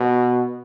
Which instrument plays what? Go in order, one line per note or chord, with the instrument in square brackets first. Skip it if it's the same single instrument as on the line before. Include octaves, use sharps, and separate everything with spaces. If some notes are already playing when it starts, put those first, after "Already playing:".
Already playing: [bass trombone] B2